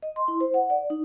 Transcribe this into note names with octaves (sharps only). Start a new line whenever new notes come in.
D#5
C6
E4
C5
F#5
D5
D#4